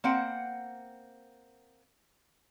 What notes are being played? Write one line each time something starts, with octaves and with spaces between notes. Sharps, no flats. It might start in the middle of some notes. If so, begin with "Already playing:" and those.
A#3 C4 F#5 G5